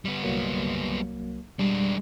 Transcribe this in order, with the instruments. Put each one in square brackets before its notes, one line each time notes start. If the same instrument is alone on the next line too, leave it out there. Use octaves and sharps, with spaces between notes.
[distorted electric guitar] G3 B3
[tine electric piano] C2 F#3 A#3
[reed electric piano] G3 [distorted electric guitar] G#3 D4